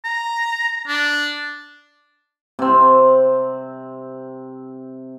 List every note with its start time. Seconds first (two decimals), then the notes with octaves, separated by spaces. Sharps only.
0.05 A#5
0.87 D4
2.59 C3 C4